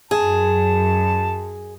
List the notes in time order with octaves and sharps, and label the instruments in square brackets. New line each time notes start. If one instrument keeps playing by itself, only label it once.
[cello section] F#2 [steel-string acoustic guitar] G#4 [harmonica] A5